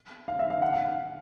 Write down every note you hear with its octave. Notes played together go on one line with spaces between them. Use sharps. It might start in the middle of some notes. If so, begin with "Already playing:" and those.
F5
E5
F5
F#5
F5